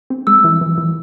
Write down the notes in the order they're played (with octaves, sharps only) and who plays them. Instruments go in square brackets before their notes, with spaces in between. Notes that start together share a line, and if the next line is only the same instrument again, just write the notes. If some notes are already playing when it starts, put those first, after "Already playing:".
[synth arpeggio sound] C4
[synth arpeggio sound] G#3 [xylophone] E6
[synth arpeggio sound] E3
E3
E3